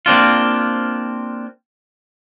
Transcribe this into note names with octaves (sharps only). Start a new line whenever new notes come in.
A#3 C4 D4 F4